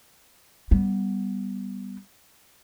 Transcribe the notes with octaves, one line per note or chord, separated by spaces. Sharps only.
G3 B3